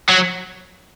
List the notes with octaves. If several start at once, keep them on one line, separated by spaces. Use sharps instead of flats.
F#3